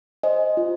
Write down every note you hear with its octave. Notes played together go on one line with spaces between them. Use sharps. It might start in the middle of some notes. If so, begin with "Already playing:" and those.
C5 D#5 G#5
F4